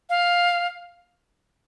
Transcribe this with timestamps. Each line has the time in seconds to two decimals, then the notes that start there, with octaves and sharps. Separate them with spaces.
0.10 F5